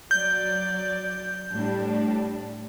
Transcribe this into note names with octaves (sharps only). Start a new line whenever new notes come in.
F#3 D5 G6
A2 G3 D4